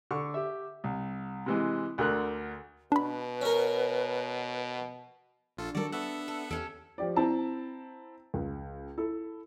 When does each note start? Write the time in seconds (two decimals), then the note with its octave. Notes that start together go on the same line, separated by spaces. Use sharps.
0.11 D3 C#6
0.34 G4 E5
0.84 C2
1.46 C3 E3 G#3
1.98 D2 D3 A#4 F#6
2.92 B2 D4 B4 B5
3.41 C#4 A#4
5.57 A#1 D4 F4 A4
5.75 D#3 G3 F#4 A4 A#4 D5
5.92 B3 A4 E5 F#5
6.28 A4
6.51 E2 C#4 G4 A4 D7
6.98 F3 G4 D5
7.16 C4 E4 A5 A#5
8.34 C#2
8.98 E4 A4